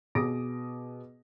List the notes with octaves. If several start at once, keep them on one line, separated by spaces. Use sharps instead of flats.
B2 G#4 D6 D#6 A#6 D7